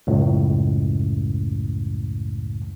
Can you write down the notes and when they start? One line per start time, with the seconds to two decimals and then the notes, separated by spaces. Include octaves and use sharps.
0.07 C#2 F#2 A2